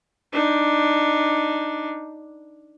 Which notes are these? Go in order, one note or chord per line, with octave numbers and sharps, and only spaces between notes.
D4 D#4